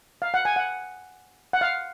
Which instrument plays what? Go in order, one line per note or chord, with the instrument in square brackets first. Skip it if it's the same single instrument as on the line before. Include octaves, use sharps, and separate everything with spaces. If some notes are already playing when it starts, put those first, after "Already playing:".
[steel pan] F5
F#5
G#5
F#5
F#5
F5